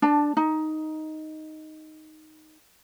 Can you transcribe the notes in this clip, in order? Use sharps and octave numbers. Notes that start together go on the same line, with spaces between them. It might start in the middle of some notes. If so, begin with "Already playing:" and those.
D4 A5
D#4